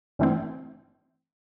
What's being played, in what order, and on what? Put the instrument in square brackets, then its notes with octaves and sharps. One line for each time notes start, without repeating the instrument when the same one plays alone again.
[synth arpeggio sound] G2 E3 A3 C4